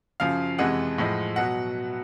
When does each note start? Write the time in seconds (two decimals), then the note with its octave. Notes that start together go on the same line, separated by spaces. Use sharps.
0.20 F#2 C#3 F3 F5
0.59 F2 C3 E3 G#3 F#5
0.98 A2 F3 G#3
1.36 B2 F#3 F#5